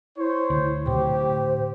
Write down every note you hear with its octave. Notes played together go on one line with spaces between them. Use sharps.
E4 C5 C#5
D2
A2 D3 G4 C5